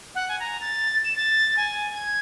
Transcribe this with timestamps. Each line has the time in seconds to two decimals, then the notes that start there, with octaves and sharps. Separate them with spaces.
0.15 F#5
0.28 G#5
0.39 A#5
0.60 A6
1.04 E7
1.16 A6
1.57 G#5
1.93 G#6